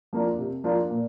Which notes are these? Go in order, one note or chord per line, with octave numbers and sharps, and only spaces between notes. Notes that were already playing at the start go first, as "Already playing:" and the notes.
F3 A#3 D4 F4
C3
F3 A#3 D4 F4
A#2